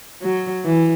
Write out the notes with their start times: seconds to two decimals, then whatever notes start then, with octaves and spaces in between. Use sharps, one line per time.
0.23 F#3
0.64 E3